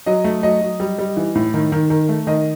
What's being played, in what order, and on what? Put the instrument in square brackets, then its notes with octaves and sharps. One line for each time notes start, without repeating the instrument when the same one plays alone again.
[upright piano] F#3 D#5
A3
F#3 D#5
F#3
G3
G3
E3
A2
D#3
D#3
D#3
A3
D#3 D#5